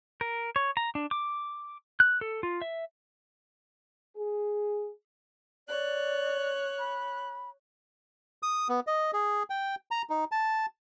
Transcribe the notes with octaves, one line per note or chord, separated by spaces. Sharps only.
A#4
C#5
A#5
D4
D6
F#6
A4
F4
E5
G#4
C#5 D5 F#6
B5
D#6
B3
D#5
G#4
G5
A#5
D#4
A5